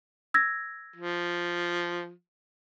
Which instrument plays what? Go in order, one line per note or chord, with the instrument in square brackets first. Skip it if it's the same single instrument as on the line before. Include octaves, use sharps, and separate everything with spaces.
[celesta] E6 G#6 A#6
[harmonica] F3